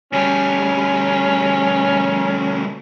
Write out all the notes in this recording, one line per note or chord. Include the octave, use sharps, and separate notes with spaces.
D2 G3 C#4